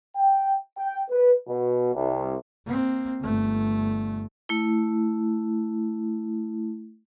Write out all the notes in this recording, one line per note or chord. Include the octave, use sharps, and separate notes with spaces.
G5
G5
B4
B2
C2
A#3 C4
G1 A3
A3 E4